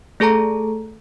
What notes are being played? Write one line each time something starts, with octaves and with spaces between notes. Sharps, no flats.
A3 G#4 A4 A5 A#5